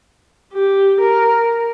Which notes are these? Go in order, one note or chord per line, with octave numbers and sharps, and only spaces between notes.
G4
A#4